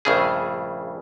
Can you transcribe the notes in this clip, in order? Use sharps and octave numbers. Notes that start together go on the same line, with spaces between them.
A#1 G2 C#3 A3 G#4